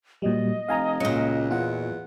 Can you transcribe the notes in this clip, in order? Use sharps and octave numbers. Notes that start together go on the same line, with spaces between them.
A#2 F#3 G3 D#5
F1 F5 G#5 A#5
C#2 A#2 F#3
E2 F4 F#5